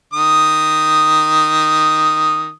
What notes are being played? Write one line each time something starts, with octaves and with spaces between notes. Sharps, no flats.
D#3 D#6